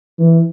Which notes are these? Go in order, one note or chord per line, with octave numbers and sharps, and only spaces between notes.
E3